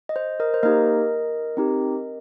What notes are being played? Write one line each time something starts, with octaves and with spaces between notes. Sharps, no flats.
D#5
C5
A#4 D#5
C5
A#3 D#4 G4 A#4 D#5
C4 D#4 G4